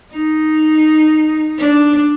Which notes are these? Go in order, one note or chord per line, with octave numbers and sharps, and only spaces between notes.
D#4
D4